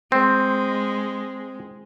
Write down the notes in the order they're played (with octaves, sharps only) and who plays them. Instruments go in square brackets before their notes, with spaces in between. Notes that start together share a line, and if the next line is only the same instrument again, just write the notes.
[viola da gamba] G#3 [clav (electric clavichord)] C4